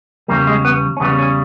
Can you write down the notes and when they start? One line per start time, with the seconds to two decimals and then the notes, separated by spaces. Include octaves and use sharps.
0.28 E2 C#3 G3 A#3
0.47 G#3
0.65 B3
0.97 C#4
1.00 E2 C#3 G3 B3
1.18 C#4